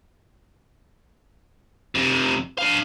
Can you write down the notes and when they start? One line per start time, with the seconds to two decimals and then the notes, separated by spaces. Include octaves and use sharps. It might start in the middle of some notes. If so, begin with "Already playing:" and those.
1.95 F2 C3
2.59 D4 F5